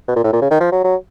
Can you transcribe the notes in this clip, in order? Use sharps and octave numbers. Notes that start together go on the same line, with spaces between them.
B2
A#2
A2
A#2
C#3
D#3
F3
F#3
F#3